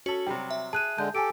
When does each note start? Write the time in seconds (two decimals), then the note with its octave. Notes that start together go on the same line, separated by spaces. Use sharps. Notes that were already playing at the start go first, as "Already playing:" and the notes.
0.06 C#4 F#4 A4
0.27 C3 F#3 G3 G5
0.50 E5
0.73 G#4 A5 F#6 D#7
0.98 D3 G#3 A5 G6
1.15 G4 A4 G#5 D7